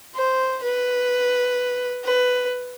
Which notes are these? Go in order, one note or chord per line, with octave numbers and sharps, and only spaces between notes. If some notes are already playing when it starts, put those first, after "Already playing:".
C5
B4
B4